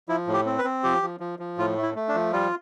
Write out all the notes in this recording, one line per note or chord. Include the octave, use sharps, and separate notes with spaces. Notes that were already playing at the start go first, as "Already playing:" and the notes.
F3 E4
A2
G4
C4
B4
C4
F3 G4
F3
F3
F3
A2 F4
A3
E4
A3
D4
F3
G3 F4